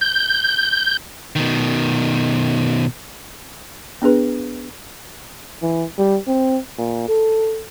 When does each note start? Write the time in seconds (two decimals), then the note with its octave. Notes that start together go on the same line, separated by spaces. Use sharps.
0.01 G6
1.36 B2 D#3
4.02 B3 D4 G#4 B4
5.62 E3
5.98 G3
6.27 C4
6.78 A#2
7.08 A4